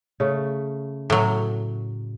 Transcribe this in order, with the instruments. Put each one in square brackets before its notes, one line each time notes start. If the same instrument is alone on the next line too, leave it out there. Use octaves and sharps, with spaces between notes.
[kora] C#3 A3
[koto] A2 F#3